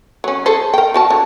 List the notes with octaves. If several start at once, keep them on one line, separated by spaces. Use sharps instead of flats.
F#3 C#4
G#4 A4 C5
A#4 G5
F3 F#4 A5
D3 F#3